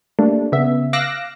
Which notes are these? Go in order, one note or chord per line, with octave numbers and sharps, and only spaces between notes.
G3 A3 A#3 D4
C#3 B3 E5
F5 D6 E6 F#6 A#6